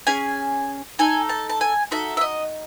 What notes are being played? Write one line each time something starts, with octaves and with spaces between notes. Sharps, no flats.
C#4 G#4 G#5
D#4 A4 G#5
A5
A5
G#5
D#4 F#4 A4 E5
E5
D#5